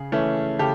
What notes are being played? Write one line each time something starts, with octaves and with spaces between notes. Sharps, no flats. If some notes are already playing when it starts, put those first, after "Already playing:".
Already playing: C#3 G#4
E3 A3 C#4
C#3 G4 A4